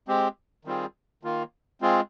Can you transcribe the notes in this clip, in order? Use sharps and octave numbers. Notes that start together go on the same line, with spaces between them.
G#3 C4 G4
D#3 G3 C4 F4 G#4
D#3 A#3 F4
G#3 C4 F4 G#4